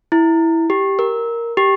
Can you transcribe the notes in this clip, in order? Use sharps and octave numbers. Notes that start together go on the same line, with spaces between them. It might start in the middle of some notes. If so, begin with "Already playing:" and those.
E4
G4
A#4
G4